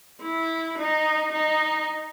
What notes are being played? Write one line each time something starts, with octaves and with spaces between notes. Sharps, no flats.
E4
D#4
D#4